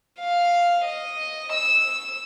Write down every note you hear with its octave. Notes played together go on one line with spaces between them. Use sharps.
F5
D#5
E6